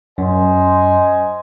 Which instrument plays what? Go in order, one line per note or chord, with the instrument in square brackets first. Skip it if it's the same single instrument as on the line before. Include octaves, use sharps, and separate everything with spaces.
[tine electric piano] F#2 [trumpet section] C5 D#5 G#5